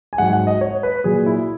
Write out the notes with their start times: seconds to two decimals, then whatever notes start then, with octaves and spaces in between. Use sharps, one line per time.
0.13 G#5
0.18 G#2 F#3 F#5
0.33 F#5
0.47 D#5
0.61 C#5
0.83 B4
1.04 A#2 F#3 G#4
1.26 E4